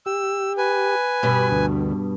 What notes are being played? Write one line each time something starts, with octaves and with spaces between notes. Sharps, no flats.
G4 E6
B4 G#5
G2 B2 B5
D2